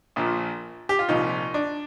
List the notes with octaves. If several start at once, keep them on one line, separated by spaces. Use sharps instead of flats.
A#1 A#2 F3
G4
F4
C2 A#2 F3 D#4
D4